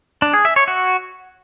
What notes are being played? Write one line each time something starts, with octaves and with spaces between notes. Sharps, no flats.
D4
G#4
E5
C#5
F#4